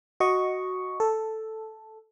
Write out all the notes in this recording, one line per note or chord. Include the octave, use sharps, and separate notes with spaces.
F#4 D#5 C#6
A4